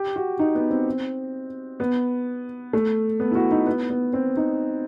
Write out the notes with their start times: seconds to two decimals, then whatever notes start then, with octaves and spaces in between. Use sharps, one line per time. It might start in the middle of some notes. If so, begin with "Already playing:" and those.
Already playing: G4
0.16 F#4
0.39 D#4
0.55 B3
0.70 C4
1.80 B3
2.73 A3
3.20 B3
3.31 E4
3.35 F#4
3.51 D#4
3.66 B3
3.90 B3
4.13 C4
4.37 D#4